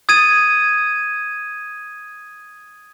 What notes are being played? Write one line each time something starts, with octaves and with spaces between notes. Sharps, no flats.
D#6 G#6 A6 D#7